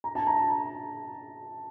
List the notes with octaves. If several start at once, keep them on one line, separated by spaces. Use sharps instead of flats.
A#5
A5
A#5